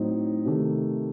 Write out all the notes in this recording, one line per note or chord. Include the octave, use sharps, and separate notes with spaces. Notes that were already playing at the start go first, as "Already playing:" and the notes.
Already playing: A2 F#3 C4 D#4
C3 D#3 A3